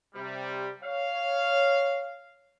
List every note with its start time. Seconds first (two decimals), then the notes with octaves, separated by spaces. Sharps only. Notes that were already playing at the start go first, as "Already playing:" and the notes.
0.15 C3 G3
0.83 C#5 F5